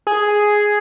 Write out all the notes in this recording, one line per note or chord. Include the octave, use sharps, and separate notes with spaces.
G#4